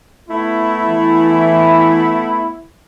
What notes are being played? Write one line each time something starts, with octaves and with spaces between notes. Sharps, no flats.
A3 B3 E4
E3